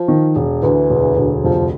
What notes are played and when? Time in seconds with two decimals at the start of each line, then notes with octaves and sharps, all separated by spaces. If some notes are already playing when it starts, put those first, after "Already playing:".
Already playing: F3
0.08 D#3
0.35 E1
0.62 D2 E3
0.90 E1
1.16 D2
1.44 F1 F3